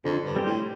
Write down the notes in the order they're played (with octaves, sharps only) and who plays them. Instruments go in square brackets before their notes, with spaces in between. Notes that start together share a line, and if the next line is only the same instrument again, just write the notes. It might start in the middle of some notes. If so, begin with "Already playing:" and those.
[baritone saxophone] F2 [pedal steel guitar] D3
[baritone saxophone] G2
[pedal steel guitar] G3 C4 G4 C5
[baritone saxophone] A2